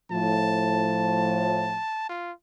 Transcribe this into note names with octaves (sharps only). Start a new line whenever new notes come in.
A2 F3 A5
F4